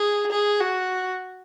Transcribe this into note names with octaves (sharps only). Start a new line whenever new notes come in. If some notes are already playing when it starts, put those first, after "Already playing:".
Already playing: G#4
G#4
F#4